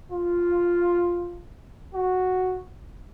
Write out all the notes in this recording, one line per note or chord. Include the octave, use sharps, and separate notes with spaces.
F4
F#4